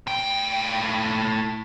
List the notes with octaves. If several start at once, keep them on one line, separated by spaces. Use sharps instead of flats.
A2 G5